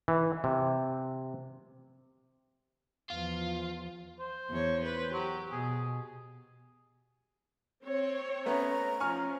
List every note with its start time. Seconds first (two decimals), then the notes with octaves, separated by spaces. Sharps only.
0.08 E3
0.44 C3
3.10 E2 F3 F4
4.20 C5
4.51 E2 C#5
4.84 B4
5.13 F#3 G4
5.52 B2 G#4
7.83 C4 C#5
8.46 A3 B3 C#4 A#5
9.00 F3 C#4 G#5 C#6 F6